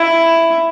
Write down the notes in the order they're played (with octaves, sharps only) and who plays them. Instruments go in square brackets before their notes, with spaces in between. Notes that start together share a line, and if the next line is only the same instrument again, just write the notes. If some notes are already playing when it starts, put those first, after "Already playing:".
Already playing: [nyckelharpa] E4